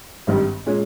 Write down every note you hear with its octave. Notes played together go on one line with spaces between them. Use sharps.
G#1 G2 D#3 G3
A#2 G#3 C#4